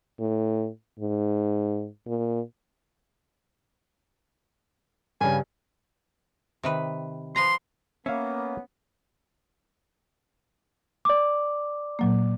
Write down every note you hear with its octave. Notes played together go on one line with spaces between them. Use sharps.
A2
G#2
A#2
G2 C#3 G#5
C3 D#3 B4
F3 B4 A#5 C6
A#3 B3 C#4 E5 F5
D5 D6
A#2 F#3 A#3